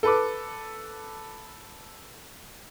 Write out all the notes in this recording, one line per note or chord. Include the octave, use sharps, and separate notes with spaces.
A4 B4 D6